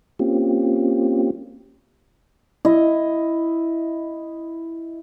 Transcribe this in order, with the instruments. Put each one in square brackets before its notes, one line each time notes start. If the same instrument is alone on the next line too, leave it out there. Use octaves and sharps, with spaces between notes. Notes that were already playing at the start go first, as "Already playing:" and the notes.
[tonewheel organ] A#3 C4 C#4 F4 G4
[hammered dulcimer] E4 D#5